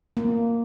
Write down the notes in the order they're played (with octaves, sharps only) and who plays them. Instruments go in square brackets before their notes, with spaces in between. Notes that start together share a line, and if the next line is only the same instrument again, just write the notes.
[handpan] A#3